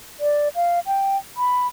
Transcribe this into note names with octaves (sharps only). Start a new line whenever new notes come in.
D5
F5
G5
B5